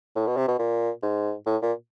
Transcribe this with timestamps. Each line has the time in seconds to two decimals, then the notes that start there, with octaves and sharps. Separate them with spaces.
0.16 A2
0.27 B2
0.37 C3
0.48 B2
0.59 A#2
1.03 G#2
1.47 A2
1.62 A#2